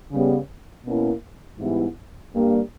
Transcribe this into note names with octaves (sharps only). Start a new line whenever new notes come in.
C#3 G3 B3
B2 A#3 C#4 E4
G#2 E3 G3 B3 E4
G2 G3 A#3